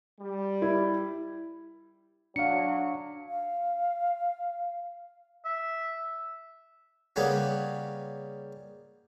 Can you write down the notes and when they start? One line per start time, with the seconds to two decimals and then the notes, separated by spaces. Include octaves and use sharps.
0.20 G3
0.62 E4
2.36 F#3 D4 F5 C#7
3.29 F5
5.45 E5
7.16 C#3 G3 A#3 B3 C#4